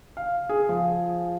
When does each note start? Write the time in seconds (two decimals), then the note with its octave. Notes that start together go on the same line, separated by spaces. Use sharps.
0.17 F5
0.49 G#4
0.69 F3